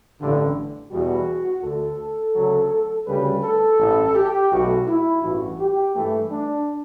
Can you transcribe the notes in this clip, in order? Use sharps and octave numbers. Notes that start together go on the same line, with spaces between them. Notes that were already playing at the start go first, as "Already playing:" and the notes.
A1 G2 D3
E2 B2 G3 F#4
D2 D3 A3 A4
D2 C#3 F#3
D2 C#3 G3 B4
A4
A1 G2 E3 A3
G4
B1 B2 A3 F#4
E4
A1 G2 E3 F#4
G4
G2 E3 A3
D4